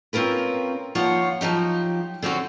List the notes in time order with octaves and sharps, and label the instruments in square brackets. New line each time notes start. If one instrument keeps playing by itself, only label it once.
[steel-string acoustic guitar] C4 C#4 F4 A#4 B4
D#2 F3 F4 C#5 F#5
F3 F#3 D#4 G4
D3 C4 C#4 F#4